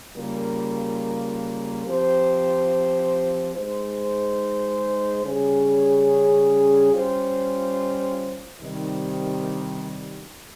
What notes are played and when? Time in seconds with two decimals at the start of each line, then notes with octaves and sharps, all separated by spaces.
0.16 C#3 G3 A#3 F4 A#4
1.86 F3 C4 G4 C5
3.54 G#3 D#4 G#4 C5
5.24 C#3 G3 C#4 G#4 C#5
6.92 G3 C#4 F4 C5
8.61 C3 D#3 G3